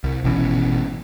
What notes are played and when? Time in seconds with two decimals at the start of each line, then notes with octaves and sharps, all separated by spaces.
0.04 C2
0.24 G#1 B2 E3 C#4